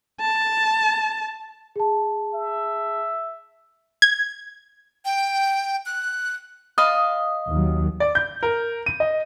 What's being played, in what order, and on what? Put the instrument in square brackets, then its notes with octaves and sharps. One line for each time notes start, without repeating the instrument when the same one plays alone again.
[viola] A5
[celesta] G#4 A5
[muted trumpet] E5
[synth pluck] G#6
[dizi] G5
F#6
[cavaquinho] D#5 F5 B5 [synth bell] D#6
[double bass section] D#2 F#3
[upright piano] D5
G6
A#4
D#7
D#5